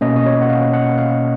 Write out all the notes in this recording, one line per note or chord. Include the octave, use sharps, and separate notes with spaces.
B2 A#3 C#4 D#5
D#5
C#5
F#5
F5
F#5
F5